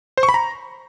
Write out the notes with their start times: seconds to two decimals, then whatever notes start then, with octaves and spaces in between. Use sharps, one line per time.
0.17 C5
0.23 C#6
0.29 B5
0.34 A#5